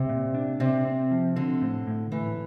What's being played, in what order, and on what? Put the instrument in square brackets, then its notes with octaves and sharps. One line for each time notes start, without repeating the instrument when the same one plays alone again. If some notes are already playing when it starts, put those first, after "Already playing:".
Already playing: [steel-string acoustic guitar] C3
[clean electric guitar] A#2
D4
[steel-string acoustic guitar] C3 [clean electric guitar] C4
[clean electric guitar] C4
F3
[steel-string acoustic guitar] D3 [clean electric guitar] C4
[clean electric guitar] A2
A2
[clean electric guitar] A2 [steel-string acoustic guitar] E3